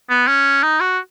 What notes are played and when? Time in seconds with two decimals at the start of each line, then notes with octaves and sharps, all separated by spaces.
0.10 B3
0.27 C#4
0.63 D#4
0.80 F#4